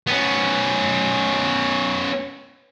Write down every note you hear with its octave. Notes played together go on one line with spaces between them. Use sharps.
B3 C#4